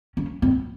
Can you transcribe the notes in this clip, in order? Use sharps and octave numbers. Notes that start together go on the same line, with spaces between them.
C#4
C4